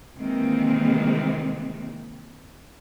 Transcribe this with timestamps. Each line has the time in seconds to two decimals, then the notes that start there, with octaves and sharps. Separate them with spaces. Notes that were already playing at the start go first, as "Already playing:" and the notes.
0.17 C3 D#3 E3 G#3 A#3 C4